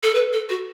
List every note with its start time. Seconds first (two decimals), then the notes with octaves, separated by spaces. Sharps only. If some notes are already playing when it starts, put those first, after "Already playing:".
0.03 A4
0.15 B4
0.33 A4
0.49 F#4